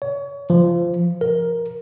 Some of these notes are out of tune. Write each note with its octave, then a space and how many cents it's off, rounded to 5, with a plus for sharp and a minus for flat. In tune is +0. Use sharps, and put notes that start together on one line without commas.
C#5 +30
F3 -15
A#4 +10